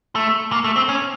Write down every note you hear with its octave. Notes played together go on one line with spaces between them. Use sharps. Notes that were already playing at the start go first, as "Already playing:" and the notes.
A3
A#3
A3
C4
C#4